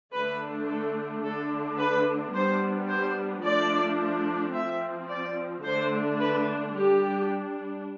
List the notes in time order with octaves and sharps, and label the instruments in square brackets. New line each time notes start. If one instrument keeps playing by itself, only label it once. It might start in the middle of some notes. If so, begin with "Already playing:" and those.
[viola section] D3 A3 D4 B4
A4
D3 A3 D4 A4
B4
G3 B3 D4 C5
C5
F3 A3 D4 D5
F3 C4 E5
D5
D3 A3 D4 C5
B4
G3 D4 G4